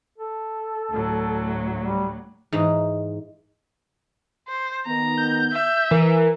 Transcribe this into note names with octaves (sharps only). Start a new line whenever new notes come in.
A4
D2 A2 F#3
G3
G#2 E3 D#4
C5
D#3 B3 A#5
G6
E5
E3 A#4